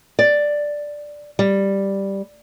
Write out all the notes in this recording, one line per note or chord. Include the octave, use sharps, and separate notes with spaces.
D5
G3